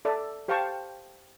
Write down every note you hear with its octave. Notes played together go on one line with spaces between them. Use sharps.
A4 D5 E5
G4 C5 F5 G5 A5 C#6